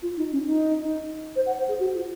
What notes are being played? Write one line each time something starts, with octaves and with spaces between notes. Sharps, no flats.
F4
D#4
C#4
D#4
C5
F#5
C5
G#4
F#4
F4